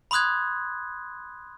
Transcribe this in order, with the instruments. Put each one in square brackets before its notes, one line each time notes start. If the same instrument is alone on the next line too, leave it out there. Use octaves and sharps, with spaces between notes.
[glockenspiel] B5 C6 D#6 F#6 G#6